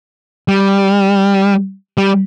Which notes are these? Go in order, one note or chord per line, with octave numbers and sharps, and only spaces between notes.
G3
G3